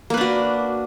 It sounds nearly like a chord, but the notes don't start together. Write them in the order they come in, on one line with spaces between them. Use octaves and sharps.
A#3 B4 D4 F#4